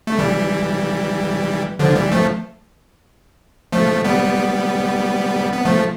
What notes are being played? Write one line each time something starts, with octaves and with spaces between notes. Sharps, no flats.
A3
E3 G3
D3 F3
E3 G3
F3 A3
F3 A3
G3 B3
B3
F3 A3